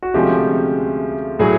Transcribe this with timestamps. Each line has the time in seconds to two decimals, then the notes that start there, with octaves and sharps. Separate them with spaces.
0.02 F#4
0.14 D2 C3 F3 G#3 C#4 G4
1.39 A2 F#3 A3 G#4